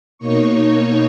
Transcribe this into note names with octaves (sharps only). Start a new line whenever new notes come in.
B2 A#3 D#4 C#5 C#6